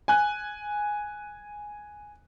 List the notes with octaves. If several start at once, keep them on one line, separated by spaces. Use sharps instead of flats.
G#5 F#6